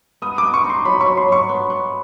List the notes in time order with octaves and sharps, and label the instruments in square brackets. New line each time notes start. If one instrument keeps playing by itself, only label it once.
[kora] B3 [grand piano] D#6
[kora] B3 [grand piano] D6
[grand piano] C#6
[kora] D#4
[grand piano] C6
[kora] F#3 [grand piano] B5
[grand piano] C#6
[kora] F#3
[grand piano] C6
[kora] F#3 [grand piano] C#6
[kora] B3
B3